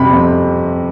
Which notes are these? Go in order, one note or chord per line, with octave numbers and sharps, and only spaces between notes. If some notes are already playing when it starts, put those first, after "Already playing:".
Already playing: F2 C3 G3 B5
F2